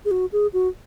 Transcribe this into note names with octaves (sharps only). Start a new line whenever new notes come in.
G#4
F#4
G#4
F#4